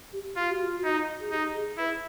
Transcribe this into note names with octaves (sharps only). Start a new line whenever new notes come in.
G4
F4 G4
F#4
F4
F#4
D#4
G#4
D#4 G4
G#4
E4 B4